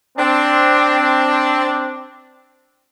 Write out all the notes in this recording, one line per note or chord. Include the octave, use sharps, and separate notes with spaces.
C4 D4